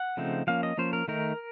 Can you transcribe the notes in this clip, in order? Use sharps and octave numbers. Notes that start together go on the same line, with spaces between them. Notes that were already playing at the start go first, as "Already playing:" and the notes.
Already playing: F#5
C#3 F3 A3 C4 D#4
F3 A#3 C#4 F5
D#5
F3 A#3 C#4 C5
A#4
D#3 A3 D#4 A#4